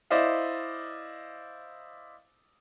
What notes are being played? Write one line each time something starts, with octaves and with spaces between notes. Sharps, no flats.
E4 C5 D5 D#5 F5